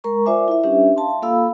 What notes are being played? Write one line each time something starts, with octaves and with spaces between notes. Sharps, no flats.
G#3 A#4 A#5 C#6
F4 C5 D5 E5 G#5 D6
E4 E5
G3 C#4 D4 G4 B4 E5
F5 A5 C6
A#3 F4 A4 F5 B5 E6